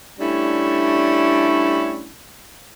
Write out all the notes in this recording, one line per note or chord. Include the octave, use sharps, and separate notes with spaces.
G3 A3 C#4 D4 E4